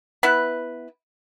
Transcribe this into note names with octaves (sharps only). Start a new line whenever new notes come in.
B3 E4 B4